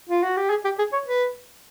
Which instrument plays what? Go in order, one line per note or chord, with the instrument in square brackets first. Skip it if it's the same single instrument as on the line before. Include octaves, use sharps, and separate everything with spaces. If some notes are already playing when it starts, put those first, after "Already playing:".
[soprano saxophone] F4
F#4
G4
G#4
G4
G#4
C#5
B4